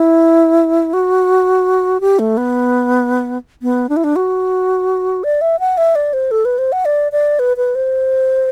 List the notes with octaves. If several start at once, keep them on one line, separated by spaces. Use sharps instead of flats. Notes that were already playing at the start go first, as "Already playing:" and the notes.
Already playing: E4
F#4
G4
A3
B3
B3
D4
E4
D4
F#4
D5
E5
F#5
E5
D5
C5
A4
B4
C5
F#5
D5
D5
B4
B4
C5